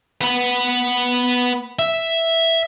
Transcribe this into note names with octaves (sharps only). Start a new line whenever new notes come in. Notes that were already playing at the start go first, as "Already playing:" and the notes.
B3 B4
E5